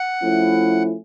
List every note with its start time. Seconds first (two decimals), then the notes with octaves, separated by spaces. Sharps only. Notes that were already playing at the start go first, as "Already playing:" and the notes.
Already playing: F#5
0.23 F3 A3 C#4 E4